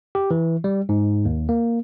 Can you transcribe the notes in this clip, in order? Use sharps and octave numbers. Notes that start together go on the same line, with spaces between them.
G4
E3
G3
G#2
D#2
A#3